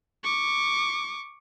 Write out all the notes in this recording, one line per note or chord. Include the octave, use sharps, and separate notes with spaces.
C#6 D6